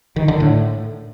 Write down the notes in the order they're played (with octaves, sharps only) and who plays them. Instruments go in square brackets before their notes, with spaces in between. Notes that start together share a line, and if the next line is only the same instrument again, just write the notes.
[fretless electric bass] D#3
D3
A2